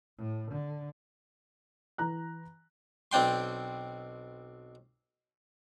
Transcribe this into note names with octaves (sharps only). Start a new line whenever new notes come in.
A2
D3
E3 A#5 F#6
B1 C4 D4 G5 C6